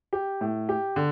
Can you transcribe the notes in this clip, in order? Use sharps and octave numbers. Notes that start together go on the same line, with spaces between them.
G4
A2
G4
D3